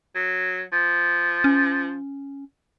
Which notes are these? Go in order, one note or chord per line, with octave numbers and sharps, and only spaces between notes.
F#3
F3
C#4